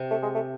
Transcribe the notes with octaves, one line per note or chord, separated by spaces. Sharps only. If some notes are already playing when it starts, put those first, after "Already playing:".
Already playing: C3
A3
G#3
A3